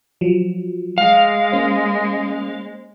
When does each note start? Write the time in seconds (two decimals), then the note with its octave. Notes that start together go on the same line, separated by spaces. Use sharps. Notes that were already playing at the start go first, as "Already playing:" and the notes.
0.21 F3 F#3
0.98 G#3 F5
1.52 A#3 C#4 C5